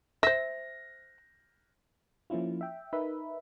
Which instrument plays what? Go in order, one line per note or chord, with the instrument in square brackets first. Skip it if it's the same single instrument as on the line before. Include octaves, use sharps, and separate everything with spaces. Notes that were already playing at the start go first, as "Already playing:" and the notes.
[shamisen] C5 E5 [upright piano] A#6
[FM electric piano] F3 A#3 C#4 E4 F4
E5 G5
D#4 A#4 B4 E5 B5